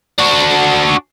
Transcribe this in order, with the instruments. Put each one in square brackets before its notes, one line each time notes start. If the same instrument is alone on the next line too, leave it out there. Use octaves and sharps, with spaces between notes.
[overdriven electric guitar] D4 F#4